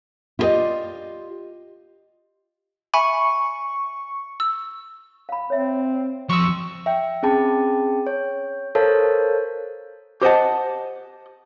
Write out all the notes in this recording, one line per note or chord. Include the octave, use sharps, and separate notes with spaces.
E4 F4 G4 B4 D5 D#5
E5 G#5 B5 C#6
E6
F5 B5
C4 C#5 E5
F2 F#4 C6 C#6 D#6 E6
E5 G5
C4 C#4 G#4 G5 A5 B5
C#5
A4 A#4 C5 C#5 F5 A5
G4 C5 D#5 F#5 A5